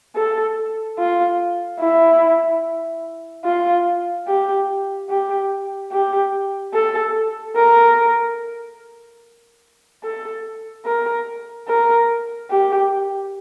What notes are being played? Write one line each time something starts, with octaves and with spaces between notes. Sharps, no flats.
A4
F4
E4
F4
G4
G4
G4
A4
A#4
A4
A#4
A#4
G4